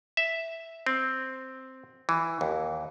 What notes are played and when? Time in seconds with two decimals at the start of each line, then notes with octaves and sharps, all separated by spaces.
0.17 E5
0.86 C4
2.09 E3
2.41 D#2